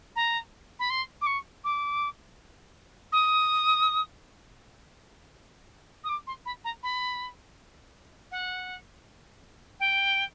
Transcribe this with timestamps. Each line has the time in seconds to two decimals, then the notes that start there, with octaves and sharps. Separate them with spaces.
0.16 A#5
0.79 B5
0.90 C6
1.21 D6
1.26 C#6
1.64 D6
3.12 D#6
6.04 D#6
6.09 D6
6.27 C6
6.45 B5
6.64 A#5
6.83 B5
8.31 F#5
9.80 G5